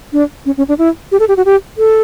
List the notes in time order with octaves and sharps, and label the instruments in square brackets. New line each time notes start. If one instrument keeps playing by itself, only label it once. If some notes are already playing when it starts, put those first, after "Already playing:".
[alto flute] D4
C#4
C#4
D4
E4
G4
A4
G4
F#4
G4
A4